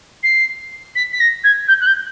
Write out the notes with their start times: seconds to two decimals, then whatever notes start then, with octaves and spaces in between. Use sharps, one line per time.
0.23 C7
0.95 B6
1.12 B6
1.20 A#6
1.44 G#6
1.68 G6
1.80 F#6
1.86 G6